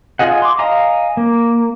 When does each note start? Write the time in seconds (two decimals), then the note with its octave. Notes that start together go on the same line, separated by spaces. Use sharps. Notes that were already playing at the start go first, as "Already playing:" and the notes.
0.19 F4 G#4 D#5 F#5
0.42 C6 D6
0.59 D#5 F5 G#5 A#5
1.17 A#3